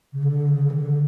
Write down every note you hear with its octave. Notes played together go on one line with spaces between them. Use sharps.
C#3
D3
C#3
E3
D3